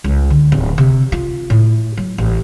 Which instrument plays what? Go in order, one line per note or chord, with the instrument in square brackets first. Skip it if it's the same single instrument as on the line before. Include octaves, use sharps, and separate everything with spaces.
[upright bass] C#2
D3
D1
C3
F4
A2
F#3
A1